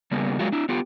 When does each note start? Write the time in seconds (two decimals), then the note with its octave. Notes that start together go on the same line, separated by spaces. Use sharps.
0.11 C#3 G3 A#3 B3
0.39 F#3 G#3 A#3 F4 F#4
0.52 D4 E4
0.69 B3 F4 G4